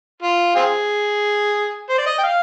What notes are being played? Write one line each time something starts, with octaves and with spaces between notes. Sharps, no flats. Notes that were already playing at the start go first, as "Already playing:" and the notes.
F4
C4 F4 G#4
C5
D5
D#5
G5
F5